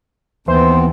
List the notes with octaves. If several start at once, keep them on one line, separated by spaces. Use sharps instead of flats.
D#2 E3 B3 C4 C5